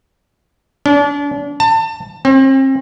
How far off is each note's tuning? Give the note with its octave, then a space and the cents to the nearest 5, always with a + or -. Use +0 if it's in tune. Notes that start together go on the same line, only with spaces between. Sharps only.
D4 -35
A5 +30
C4 +40